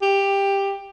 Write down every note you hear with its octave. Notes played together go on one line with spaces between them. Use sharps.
G4